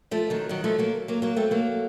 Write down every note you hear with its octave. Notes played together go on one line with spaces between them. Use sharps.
F3 A3
D#3 F#3
D#3 F#3
F3 A3
F#3 A#3
F#3 A#3
F#3 A#3
A3 C4
F#3 A#3